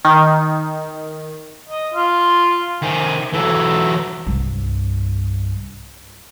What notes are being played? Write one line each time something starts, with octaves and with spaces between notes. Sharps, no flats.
D#3
D#5
F4
C3 D#3 G#5
E3 F#3 A4
C2 G2